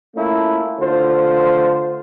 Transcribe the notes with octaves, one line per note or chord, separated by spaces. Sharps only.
A3 A#3 C#4 E4 F4
D3 A3 F4 C5